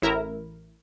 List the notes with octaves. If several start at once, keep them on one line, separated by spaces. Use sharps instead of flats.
A1 E4 A#4